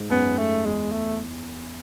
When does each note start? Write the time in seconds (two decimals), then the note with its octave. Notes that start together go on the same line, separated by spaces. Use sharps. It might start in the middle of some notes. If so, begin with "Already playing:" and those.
Already playing: G#2
0.10 F#2 B3
0.38 A3
0.65 E2 G#3
0.92 A3